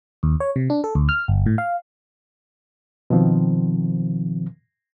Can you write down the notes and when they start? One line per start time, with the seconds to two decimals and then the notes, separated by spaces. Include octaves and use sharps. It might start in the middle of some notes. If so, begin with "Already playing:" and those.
0.23 D#2
0.40 C#5
0.56 C3
0.70 D4
0.84 A4
0.95 D2
1.09 F6
1.28 G1
1.46 A2
1.58 F5
3.10 B2 D#3 F3 C4